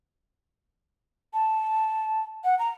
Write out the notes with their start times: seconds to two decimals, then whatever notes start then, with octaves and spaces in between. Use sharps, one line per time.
1.34 A5
2.44 F#5
2.59 A#5